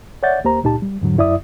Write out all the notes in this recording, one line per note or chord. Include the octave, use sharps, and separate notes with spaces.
C#5 D5 E5 F#5 G6 A6
D#2 A#3 G4 C5 A#5
C#2 A#2 D#4 G4 A5
G3
E2 G#2 D3 F#3
F#2 E4 D5 E5 D#6